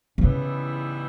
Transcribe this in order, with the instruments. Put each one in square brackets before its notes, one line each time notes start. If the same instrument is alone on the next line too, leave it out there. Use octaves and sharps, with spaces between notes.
[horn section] G#2 E3 G3 B3 E4 [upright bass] C#3